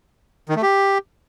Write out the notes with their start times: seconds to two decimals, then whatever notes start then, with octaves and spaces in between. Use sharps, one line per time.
0.49 D#3
0.56 A3
0.63 G4